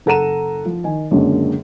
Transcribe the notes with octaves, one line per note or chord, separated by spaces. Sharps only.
F#1 A4 F#5 A#5 D#7 E7
F3
D#3 G#5
C#2 F#2 A#2 D3 G#3